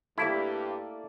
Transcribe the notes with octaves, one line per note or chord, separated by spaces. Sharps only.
G2 A3 A#3 E4 G4 D5